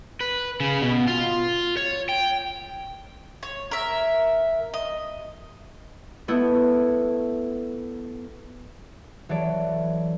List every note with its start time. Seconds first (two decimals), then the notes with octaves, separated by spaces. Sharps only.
0.20 B4
0.60 C#3
0.82 B2
1.08 F4
1.77 C#5
2.09 G5
3.43 C#5
3.71 A#4 E5
4.74 D#5
6.28 A3 B3 E4
9.29 E3 F#3 A4 C#5 D5